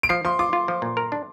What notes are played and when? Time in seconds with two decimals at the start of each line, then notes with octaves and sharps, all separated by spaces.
0.03 D7
0.09 F3 C7
0.25 F3 C6
0.39 F4 D6
0.53 F4
0.68 F3
0.82 A#2
0.97 A#4
1.12 D4